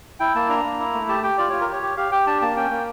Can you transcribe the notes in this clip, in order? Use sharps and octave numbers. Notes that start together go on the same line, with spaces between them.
E4 G5
A#3 A5
D4 A#5
A#3
E4
A3
G4 A5
G4 G5
F4 D5
F4 C#5
A#4
G4 C#5
G4
G4 F5
G4 G5
D4 A5
A#3 A5
C#4 G5
A#3